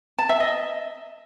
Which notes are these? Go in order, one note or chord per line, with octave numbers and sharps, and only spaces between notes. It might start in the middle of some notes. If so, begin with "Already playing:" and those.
A5
E5
D#5